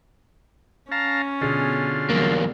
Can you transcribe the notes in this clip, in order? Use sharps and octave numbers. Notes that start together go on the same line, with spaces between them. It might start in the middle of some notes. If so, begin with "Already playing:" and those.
C#4 F5 A5 A#5
B2 D3 F4 G#4 D#5
E2 F#3 G3 A#3